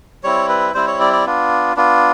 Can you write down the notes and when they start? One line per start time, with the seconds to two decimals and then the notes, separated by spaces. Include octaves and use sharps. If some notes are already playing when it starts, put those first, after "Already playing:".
0.23 G3 C4 E4 C#5
0.49 B4
0.74 G3 C4 E4 C5
0.87 C#5
1.00 D5
1.13 D5
1.25 B3 D4 F4
1.76 B3 D4 F4